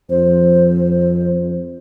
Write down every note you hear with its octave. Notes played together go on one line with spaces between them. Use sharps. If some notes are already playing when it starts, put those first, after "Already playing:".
F2 C5